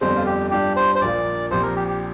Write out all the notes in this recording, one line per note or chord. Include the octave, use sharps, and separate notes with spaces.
G1 F2 D3 G3 C5
F4
G4
G2 G3 D4 F4 G4
C5
C5
A#1 A#2 A#3 F4 D5
A#1 A#2 F3 C4 G4 C5
A#4
G4
G4